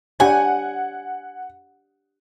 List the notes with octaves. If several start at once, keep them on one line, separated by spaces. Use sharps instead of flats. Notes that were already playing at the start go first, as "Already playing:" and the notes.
D4 G4 C#5 F#5 G#5